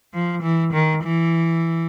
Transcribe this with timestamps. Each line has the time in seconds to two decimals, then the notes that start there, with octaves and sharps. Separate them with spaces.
0.14 F3
0.42 E3
0.73 D#3
1.03 E3